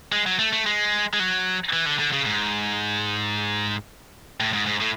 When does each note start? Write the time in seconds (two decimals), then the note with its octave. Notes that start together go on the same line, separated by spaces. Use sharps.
0.12 G#3
0.26 F#3
0.39 A3
0.53 A3
0.66 G#3
1.14 G#3
1.20 F#3
1.73 E3
1.86 D3
1.99 D3
2.13 C#3
2.26 G#2
4.40 A2
4.53 G#2
4.66 G#2
4.80 A2